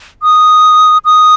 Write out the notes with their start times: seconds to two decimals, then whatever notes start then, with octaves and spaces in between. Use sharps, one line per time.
0.23 D#6
1.05 D#6